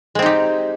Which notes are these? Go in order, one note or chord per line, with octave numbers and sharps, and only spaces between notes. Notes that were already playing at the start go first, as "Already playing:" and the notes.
G#3 C4 D#4 G4